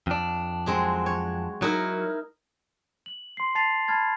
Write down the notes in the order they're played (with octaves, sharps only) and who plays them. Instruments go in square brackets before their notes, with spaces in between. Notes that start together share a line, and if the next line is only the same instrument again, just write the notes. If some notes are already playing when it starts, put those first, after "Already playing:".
[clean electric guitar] F2 D4
[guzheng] F#3 G#3 C4
C#5
[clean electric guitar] F#3 [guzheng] D#4 E4 A#4
[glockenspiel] F#7
C6 C7
A5 A6 C7 F7
A5 B5 F6 G#6 A6